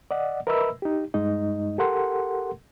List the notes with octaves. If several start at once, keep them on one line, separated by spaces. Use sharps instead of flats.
D5 D#5 F#5
A#4 B4 D#5 E5 B5 E6
D#4 G4
G2 G#3 D#4 D#5
G4 A4 A#4 F#5 C6